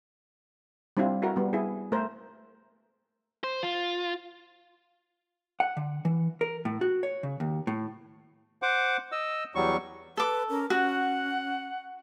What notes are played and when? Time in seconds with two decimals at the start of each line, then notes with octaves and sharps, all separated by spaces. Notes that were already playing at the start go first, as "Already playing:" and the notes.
0.97 G3 C4 D4 E4 F4
1.22 E4 F#4 A4 A#4
1.36 G3 B3
1.53 E4 G#4
1.92 A3 A#4 C5
3.44 C5
3.63 F4
5.60 F#5
5.77 D3
6.05 E3
6.41 A#4
6.65 A2
6.81 F#4
7.03 C#5
7.23 C#3
7.40 D#2
7.67 A2
8.62 C5 F#5 D6
9.12 D#5 E6
9.55 E2 F#3 G3 C#6
10.17 A4 B4 D6
10.49 C#4 A#4
10.70 C#4 F#4 F#5